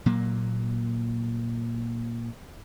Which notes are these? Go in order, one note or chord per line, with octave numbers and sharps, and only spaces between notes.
A#2 F#3 A#3